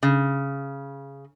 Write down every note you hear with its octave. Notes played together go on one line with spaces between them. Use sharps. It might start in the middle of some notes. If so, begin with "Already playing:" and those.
C#3